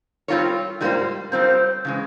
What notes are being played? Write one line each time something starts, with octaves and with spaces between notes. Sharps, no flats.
G3 C4 F4 A#4 C#5
G#2 G3 A#3 F4 C5
G3 C4 F4 A#4 C5
C#3 E3 G#3